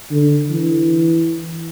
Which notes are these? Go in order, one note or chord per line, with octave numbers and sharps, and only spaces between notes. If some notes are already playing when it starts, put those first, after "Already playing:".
D3
E3